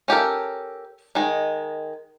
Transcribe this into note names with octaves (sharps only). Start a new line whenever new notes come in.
C#4 G4 A4 A#4
D#3 G#3